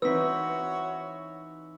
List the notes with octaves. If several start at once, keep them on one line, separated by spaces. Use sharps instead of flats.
E3 C4 D#4 F#4 B4 C#5 E6 B6